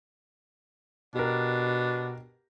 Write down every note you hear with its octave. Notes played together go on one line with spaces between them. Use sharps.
B2 D4 G4 A#4